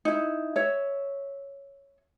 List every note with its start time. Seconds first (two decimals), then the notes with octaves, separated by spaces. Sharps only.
0.05 D#4 E4
0.56 C#5 E5